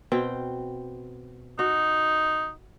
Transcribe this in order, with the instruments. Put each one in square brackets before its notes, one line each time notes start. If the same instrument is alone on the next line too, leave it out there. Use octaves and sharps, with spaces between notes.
[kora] B2 C4 G5
[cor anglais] D#4 [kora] F#4